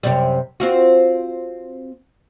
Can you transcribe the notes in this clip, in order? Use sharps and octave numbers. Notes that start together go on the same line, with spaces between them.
F#2 C3 G3
C4 F4 F#4